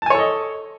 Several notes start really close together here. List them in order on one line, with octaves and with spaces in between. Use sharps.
A5 G#5 C#5 A4 D#5